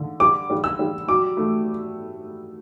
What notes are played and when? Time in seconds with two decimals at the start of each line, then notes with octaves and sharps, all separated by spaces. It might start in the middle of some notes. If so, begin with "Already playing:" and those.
Already playing: D3
0.20 G3 D6
0.50 G3
0.64 E6
0.79 G3
1.08 F#3 D6
1.37 A3